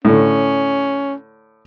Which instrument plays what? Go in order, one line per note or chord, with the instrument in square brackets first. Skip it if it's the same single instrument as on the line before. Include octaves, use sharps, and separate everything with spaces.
[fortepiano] A2 D3 [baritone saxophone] C#4